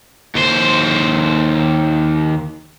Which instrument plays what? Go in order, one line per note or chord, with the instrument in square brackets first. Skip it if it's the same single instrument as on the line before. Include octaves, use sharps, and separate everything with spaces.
[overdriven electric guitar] D#2 C5